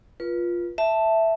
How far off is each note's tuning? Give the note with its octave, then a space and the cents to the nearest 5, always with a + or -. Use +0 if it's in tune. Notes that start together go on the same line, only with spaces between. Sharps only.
F4 +0 B4 -35
E5 +0 A5 +0